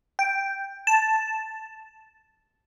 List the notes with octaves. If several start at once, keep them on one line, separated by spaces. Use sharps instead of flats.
G5
A5